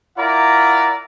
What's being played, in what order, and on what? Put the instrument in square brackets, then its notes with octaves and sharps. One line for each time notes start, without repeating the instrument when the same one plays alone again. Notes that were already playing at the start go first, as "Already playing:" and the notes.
[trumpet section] E4 F4 A#4 D5 F#5 A#5